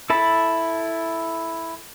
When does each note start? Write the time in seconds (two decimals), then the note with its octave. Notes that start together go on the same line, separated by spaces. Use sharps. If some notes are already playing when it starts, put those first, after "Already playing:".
0.10 E4 A4 A5 B5